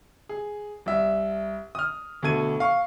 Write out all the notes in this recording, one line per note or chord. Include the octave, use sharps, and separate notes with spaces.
G#4
C2 E5
D#6 F6
D2 B2 A4 G#6 D#7
F5 C#6